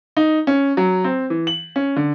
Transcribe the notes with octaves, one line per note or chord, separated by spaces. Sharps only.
D#4
C#4
F#3
C4
E3
F#7
C#4
D3